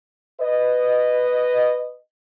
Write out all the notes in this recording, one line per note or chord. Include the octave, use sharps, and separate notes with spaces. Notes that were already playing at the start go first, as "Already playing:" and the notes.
B4 D#5